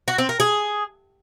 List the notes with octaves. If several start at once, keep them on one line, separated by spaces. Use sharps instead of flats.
F#4
C4
A#4
G#4